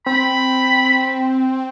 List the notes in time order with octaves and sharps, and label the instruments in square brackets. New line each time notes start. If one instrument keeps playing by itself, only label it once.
[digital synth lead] C4 [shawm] B5